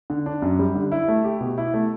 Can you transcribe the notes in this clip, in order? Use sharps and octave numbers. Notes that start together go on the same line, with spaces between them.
D3
D4
F#2
G3
D3
E4
A3
G4
B2
E4
A3